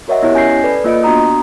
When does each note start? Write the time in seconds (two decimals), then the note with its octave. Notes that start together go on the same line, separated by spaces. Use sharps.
0.08 F#4 A#4 C#5 D#5 E5 F#5
0.23 B3 E4 G4 C#5 D#5 F#6
0.34 C#4 G#5 G6 A#6 C7
0.63 A4 B4 D5
0.84 A#3 F4 D#5 C#7 D7
1.03 B3 D4 F#4 F#5 A#5 D#6